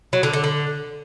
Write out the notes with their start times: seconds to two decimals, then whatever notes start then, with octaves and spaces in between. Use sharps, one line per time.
0.13 F#3
0.23 D3
0.33 D3
0.44 D3